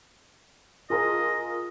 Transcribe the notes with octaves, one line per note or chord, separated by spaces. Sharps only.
F4 G#4 A#4 D#5